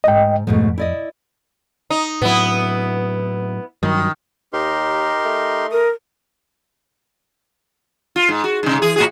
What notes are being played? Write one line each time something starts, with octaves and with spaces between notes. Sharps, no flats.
D#2 G#2 D#5 G5
F2 G#2 B2 A3
E4 D5 D#5
D#4
A2 F#3 B3 E4
G2 D#3 F#3
D#2 D#4 G4 A#4 C6
A3
A#4 D#6
F4
G#2
F#4
G#2 C3
E3 G#4
A2 F#4 G#4